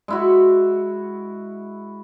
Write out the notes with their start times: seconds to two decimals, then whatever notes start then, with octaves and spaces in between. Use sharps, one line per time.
0.08 G#3 E4 F#4